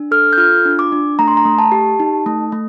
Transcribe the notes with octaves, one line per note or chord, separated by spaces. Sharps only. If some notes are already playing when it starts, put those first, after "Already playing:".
Already playing: D4
A4 F6
G6
F4 F6
D4
D6
D4
A3 A#5
C6
A#5
A3
A5
G4
D#4
A3
A3